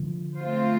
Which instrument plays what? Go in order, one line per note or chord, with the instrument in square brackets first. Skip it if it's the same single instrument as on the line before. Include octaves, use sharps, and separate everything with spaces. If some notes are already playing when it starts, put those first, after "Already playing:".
Already playing: [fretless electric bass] D3 F3
[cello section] A3 C4 F4 C5